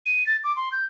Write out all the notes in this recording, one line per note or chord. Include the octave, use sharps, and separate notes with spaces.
D#7
A6
D6
C6
G6